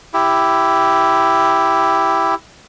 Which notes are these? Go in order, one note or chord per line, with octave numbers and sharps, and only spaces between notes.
E4 G4